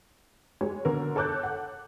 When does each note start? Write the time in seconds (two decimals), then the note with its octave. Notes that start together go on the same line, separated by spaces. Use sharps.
0.61 G#3 C#5
0.85 B2 D3 A#4
1.16 A4 C#5 D6 F#6 G6
1.43 F#5